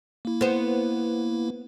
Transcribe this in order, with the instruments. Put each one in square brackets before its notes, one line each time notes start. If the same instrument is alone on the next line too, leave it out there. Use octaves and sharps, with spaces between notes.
[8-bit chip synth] A#3 E4
[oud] B3 C5